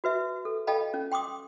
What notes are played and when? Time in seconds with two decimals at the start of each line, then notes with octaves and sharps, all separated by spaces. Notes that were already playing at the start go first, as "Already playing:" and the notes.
0.04 F#4 B4 E5
0.45 A4
0.67 A4 D#5 F5 G5 A5 B5
0.94 C#4
1.12 G5 C6 D6 D#6